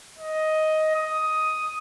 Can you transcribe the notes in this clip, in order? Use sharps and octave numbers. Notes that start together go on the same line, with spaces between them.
D#5
D#6